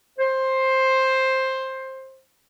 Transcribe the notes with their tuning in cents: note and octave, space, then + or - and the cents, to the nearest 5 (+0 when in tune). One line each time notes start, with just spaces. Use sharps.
C5 +10